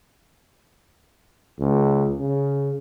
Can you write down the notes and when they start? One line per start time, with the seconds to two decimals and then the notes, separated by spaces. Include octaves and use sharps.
1.60 C#2
2.20 C#3